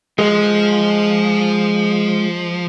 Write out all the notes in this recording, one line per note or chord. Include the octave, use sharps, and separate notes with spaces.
F3 G#3